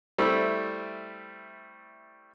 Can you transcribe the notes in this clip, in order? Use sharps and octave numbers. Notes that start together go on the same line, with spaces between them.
G3 A3 C4 E4